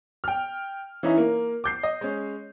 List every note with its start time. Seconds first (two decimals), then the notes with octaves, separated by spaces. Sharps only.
0.24 G5 F6
1.03 E3 C#4 D#4 E4
1.18 A#3
1.64 D6 G6 C7
1.83 D#5
2.01 G#3 C#4